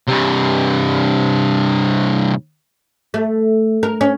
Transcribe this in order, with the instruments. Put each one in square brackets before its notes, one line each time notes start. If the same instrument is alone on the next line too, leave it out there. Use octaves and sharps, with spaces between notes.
[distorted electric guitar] G2 C3
[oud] A3
A#4
C#4